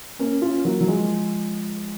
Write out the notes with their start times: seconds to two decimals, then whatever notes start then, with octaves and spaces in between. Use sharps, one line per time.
0.19 A#3 C#4
0.42 C#4 F4
0.64 F#3 A#3
0.81 F#3
0.88 F3 G#3